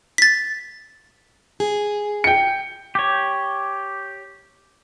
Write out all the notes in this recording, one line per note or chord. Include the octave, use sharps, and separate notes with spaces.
A6 B6
G#4
G5 C#7
G4 C#5